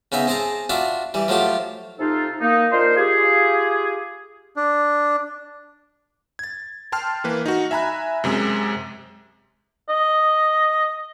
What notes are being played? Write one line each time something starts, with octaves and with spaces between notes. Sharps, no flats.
C#3 B3 D#4 E5
C4 G#4 D#5 A5 A#5
D4 F4 F#4 E5
E3 G3
F3 F#3 A3 F4 G4
C3 D#4 F4 A4
A#3 D#4
D4 D#4 F4 A#4 C5
F4 G4 G#4
D4
G#6 A6
G5 A5 C6 F6
E3 A#3 B4
D#4 F#4
E5 G#5 A#5 B5 F#6
F#2 C3 G#3
D#5